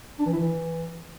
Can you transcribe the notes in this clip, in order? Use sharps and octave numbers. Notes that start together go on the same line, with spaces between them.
D4
E3
E4
E3